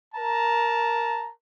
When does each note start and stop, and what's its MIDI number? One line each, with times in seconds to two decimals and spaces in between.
0.15 1.30 70
0.15 1.30 81
0.15 1.30 82